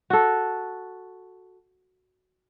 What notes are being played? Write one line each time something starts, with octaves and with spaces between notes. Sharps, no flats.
F#4 A4